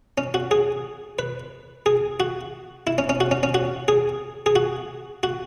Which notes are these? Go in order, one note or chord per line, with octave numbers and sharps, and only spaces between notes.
C#4
F#4
G#4
B4
G#4
F#4
E4
C#4
C#4
F#4
C#4
C#4
F#4
G#4
G#4
F#4
F#4